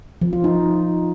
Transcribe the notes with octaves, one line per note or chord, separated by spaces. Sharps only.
F3
F4
D#4